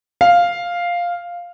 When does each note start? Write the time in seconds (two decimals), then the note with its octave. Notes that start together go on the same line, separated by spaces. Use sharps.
0.21 F5